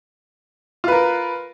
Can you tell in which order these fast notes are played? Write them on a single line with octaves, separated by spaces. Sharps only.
F4 B4 A#4